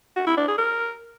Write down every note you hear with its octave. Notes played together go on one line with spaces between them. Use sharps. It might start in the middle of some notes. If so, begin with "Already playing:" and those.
F#4
E4
D4
G#4
A#4